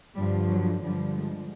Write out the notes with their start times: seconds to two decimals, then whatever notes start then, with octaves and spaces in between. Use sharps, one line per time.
0.15 G2 D3 F3 G3
0.49 F#3
0.82 G2 D3 F3 G3
1.15 G#3